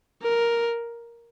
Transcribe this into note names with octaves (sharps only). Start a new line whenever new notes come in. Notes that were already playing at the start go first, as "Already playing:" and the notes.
A#4